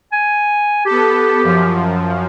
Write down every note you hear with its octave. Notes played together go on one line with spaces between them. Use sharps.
G#5
B3 G4 A4
F#2 F3